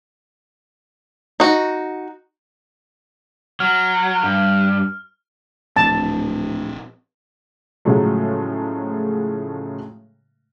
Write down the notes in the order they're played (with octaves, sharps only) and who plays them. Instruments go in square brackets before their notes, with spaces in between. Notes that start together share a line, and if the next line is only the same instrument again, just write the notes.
[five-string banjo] D#4 F#4
[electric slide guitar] F#3 [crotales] F6
[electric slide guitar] G2
[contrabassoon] D1 [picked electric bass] A#2 F3 C4 [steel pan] A5
[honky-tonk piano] A2 C#3 F3 F#3 G#3 A3